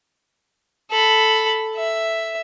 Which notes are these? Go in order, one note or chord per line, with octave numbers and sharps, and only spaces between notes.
A4 B5
E5